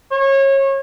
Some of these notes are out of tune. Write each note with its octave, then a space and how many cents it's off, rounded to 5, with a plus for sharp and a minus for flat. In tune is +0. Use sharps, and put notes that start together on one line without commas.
C#5 -25